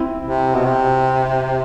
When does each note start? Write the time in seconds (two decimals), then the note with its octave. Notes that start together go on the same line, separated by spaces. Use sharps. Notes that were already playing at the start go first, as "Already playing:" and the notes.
Already playing: C4 E4
0.22 C3
0.55 B2
0.65 C3